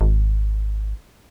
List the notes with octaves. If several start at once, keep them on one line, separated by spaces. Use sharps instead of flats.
G#1